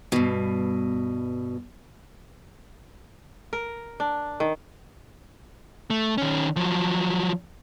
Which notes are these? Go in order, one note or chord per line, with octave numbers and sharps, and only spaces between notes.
G2 B2
A#4
D4
D#3
A3
D#3 C#4
F3 F#3